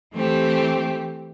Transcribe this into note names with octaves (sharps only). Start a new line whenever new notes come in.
E3 A3 C4 G4